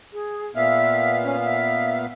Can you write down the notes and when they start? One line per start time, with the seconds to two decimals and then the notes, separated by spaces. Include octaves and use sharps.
0.12 G#4
0.55 A#2 B3 E5 F5
1.23 C#4
1.44 E5